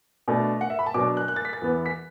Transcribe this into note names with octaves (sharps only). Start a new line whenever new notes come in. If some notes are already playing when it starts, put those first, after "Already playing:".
B2 A3 D4
F#5
E5
B5
A5
B2 F#3 D4 D6
F#6
F#6
A6
B6
A6
E2 E3 B3
B6